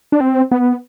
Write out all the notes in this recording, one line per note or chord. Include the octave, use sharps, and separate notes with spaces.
D4
C4
B3